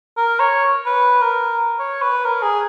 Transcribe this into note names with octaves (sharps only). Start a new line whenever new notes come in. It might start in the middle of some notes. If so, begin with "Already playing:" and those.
A#4
C#5
B4
A#4
C#5
B4
A#4
G#4